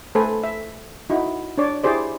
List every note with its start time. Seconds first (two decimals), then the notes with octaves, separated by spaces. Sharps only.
0.15 A3 A4 B4 C5 G#5
0.43 E5
1.10 D#4 E4 F#4
1.58 D4 C#5 D5
1.83 E4 G4 G#4 C5 D5